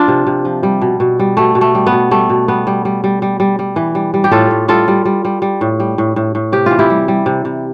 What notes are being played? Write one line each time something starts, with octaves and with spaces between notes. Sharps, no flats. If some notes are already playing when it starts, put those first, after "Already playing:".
Already playing: F3 D4 F4
C3
C3
F3
G3
B2
B2
G3
B2 A3
B2
A3
G3
B3
B2
G3 A3
B2
G3 B3
G3
G3
G3
G3
G3
G3
E3
G3
G3
G4
A2 F4 A4
A2
G3 F4 A4
G3
G3
G3
G3
A2
G3
A2
A2
A2
C3 G4
E3 F4
E4 G4
G3
G3
C3
C3